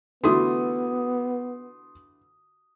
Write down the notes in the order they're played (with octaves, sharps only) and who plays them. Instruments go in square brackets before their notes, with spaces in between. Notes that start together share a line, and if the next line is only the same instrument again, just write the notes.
[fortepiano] D3 E3 A3 [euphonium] B3 [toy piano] F4 F#4 [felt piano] C6 D#6